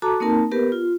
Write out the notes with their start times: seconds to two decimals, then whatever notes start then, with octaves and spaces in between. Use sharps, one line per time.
0.02 F#4 A4 A5 A#5 D6
0.20 A#3 C4 D#4 A#4 A5
0.51 B3 G4 A#4 B4
0.72 F4